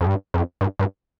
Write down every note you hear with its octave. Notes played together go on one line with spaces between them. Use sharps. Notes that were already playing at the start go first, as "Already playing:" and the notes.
F2
G2
F2
G2
G2